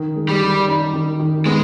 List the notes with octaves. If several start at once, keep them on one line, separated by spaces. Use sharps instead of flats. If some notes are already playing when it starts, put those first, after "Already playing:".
Already playing: D#3
G#3
G3
D#3
D#4
D#3
D#3
G#3 B3